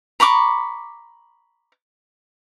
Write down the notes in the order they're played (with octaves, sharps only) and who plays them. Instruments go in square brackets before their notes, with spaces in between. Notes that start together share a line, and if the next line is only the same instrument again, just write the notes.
[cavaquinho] A#5 B5 C#6 D6